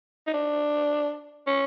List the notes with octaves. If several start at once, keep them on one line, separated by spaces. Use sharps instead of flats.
D#4
D4
C#4